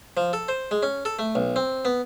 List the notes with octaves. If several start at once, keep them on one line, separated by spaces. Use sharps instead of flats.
F3
A4
C5
G#3
C#4
A4
A3
B1
C4
B3